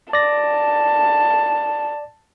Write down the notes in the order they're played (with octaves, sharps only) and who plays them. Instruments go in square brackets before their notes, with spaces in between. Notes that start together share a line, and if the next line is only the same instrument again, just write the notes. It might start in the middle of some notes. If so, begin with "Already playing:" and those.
[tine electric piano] D5 A#6 [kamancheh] A5